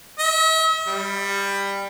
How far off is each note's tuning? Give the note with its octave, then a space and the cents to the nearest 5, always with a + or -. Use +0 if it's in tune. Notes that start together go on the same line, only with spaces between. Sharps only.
E5 -45
G3 +15